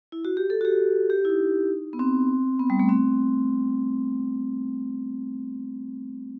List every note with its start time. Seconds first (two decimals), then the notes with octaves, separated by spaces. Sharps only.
0.12 E4
0.25 F#4
0.37 G4
0.50 A4
0.61 F#4
0.65 G4
1.10 G4
1.25 E4
1.29 D#4
1.93 B3
1.99 C4
2.59 B3
2.70 G3
2.79 A3
2.89 C4